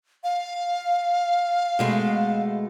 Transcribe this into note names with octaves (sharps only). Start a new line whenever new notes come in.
F5
B2 G#3 A3